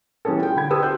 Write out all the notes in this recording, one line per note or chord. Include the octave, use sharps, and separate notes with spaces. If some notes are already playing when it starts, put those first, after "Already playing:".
E3 G3 B3 C#4 G#4 A4
F4 G#4 G5
D3 B5 G#6
G4 A4 B4 C5 D#6 E6
F#4 G4 C5 F#6 G6